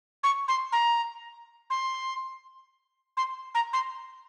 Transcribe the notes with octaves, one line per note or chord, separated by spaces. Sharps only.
C#6
C6
A#5
C6
C6
A#5
C6